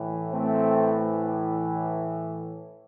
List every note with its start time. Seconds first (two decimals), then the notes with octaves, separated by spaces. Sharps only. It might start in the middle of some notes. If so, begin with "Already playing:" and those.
Already playing: A2 E3
0.32 A3 C4